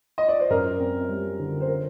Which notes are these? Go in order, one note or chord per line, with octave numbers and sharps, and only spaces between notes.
D#5
D5
C5
F#2 A#4
C4
G3
D3
C5
A#4